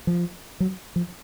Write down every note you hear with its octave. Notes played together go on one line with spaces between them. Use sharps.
F3
F#3
F3